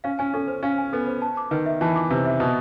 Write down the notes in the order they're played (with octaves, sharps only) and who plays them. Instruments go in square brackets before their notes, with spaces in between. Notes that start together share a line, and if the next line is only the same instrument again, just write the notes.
[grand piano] C#4 [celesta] F5
[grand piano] C#4 [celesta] G#5
[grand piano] C#4 [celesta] A4
[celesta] C5
[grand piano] C#4 [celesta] F5
[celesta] G#5
[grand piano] B3 [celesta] A4
[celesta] C5
A5
D6
[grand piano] D#3 [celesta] B4
[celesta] E5
[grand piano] E3 [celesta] A5
[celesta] D6
[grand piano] C3 [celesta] B4
[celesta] E5
[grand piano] B2 [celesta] B4